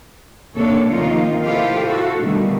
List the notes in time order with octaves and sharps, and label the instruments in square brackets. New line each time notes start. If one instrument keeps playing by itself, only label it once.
[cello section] D#2 C3 A#3 D4 A4 C#5
C3 D#3 F3 A#3 D#4 F4
E4 F4 G4 A4 C5 F5
F#4 A4
B2 D3 D#3 G3 A3